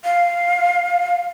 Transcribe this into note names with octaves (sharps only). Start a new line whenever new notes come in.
F5